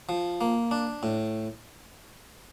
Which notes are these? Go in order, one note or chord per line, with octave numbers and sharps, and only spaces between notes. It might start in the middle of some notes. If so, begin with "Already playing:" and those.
F3
A#3
D4
A2